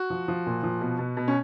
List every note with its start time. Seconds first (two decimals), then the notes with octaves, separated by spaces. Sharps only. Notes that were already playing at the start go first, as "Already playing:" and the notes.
Already playing: F#4
0.10 F3
0.28 F3
0.46 A#2
0.63 F3
0.81 B2
0.99 B2
1.17 B2
1.28 C#4